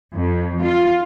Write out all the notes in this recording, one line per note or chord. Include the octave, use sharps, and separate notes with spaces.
F2
F4